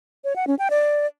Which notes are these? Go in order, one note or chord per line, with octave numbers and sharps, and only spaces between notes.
C#5
F#5
C#4
G5
D5